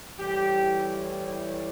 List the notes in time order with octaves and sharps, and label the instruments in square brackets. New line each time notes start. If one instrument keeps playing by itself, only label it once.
[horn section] A2 E3 G3 G4